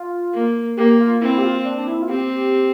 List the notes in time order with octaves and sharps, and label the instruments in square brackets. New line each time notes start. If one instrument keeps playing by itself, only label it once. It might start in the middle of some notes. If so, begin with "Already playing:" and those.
Already playing: [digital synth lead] F4
[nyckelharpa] A#3
[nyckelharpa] A#3 [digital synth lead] G4
[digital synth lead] F4
[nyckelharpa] C4 [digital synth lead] E4
[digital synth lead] G4
F4
D4
D4
E4
F4
[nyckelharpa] C4 [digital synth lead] G4